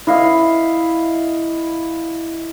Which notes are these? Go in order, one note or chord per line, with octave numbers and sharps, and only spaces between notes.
E4 D#5 F5